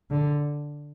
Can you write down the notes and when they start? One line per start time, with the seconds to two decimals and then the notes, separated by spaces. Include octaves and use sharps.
0.11 D3